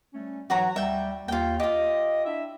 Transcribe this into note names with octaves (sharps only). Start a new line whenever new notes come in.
G3 A3 C#4
G#2 E3 F#3 F#4 C#5 A#5
D2 G3 E5 G5
D#2 F4 G5
F4 G4 D#5
D4 E4 E5